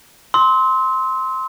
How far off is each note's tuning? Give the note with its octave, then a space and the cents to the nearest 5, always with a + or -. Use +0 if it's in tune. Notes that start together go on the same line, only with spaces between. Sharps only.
C6 +0 E6 -40